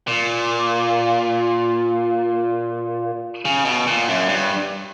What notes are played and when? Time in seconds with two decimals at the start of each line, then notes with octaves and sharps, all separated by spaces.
0.08 A#2
3.45 C#3
3.65 B2
3.87 A#2
4.08 F#2
4.29 G2